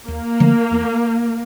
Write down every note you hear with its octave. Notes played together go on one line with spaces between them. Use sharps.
D#2 A#3
D3 F3 A3
E2